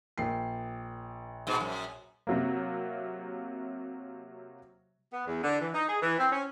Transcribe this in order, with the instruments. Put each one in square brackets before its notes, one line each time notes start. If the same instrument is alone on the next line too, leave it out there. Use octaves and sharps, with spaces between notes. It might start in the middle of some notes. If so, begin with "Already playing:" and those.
[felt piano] A#1 G5 C7
[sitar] G#2 B2
F#2
[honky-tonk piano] C3 F#3 A#3
[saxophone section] B3
E2
D3
E3
D#4
G#4
E3
C4
C#4